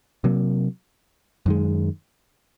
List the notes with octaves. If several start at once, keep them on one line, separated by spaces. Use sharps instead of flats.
C3 F#3 A#3
F#2 D#3 G#3